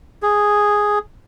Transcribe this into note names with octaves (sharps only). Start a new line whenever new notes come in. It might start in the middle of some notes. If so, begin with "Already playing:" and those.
G#4